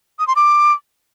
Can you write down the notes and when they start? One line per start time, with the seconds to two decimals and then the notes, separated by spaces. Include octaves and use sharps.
0.19 D#6
0.28 C6
0.36 D6